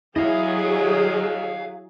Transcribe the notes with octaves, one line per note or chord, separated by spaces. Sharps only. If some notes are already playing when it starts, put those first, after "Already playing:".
F#3 E4 G#4 D#5 F5